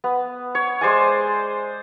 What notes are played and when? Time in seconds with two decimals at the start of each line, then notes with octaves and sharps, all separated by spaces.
0.04 B3
0.55 C#5
0.81 G#3 C5 D5 G#5